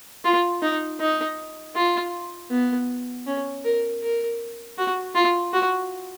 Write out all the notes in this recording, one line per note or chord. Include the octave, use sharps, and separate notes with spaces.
F4
D#4
D#4
F4
B3
C#4
A#4
A#4
F#4
F4
F#4